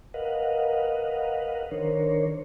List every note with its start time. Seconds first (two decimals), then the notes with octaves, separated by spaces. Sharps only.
0.14 A#4 B4 D#5 F5 F#5
1.71 D#3 D4 A#4 C5 C#5